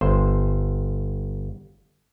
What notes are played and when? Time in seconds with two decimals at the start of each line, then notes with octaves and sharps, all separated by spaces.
0.01 G1 C5